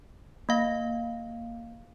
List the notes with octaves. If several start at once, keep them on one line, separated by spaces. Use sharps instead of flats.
A#3 F5